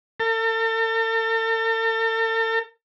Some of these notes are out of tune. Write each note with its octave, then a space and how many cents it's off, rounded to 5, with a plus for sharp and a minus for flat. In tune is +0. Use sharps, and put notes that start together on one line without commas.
A4 +40